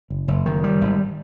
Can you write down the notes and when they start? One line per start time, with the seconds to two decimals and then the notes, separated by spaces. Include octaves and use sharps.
0.10 F#1
0.28 F#1
0.46 D#3
0.64 G3
0.81 G#1